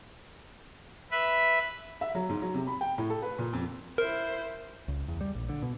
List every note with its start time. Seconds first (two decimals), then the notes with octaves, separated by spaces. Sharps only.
1.11 B4 E5
2.01 E5
2.15 F#3
2.29 G#2
2.42 F#3
2.54 C3
2.67 B5
2.81 G5
2.98 A2
3.10 A4
3.22 B4
3.39 A#2
3.53 F2
3.98 E4 A#4 C5
4.88 C#2
5.08 E2
5.21 G3
5.35 A#1
5.49 D3
5.62 B2